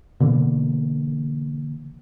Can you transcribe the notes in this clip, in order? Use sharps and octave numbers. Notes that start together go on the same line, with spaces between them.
B2 D3 E3 A#3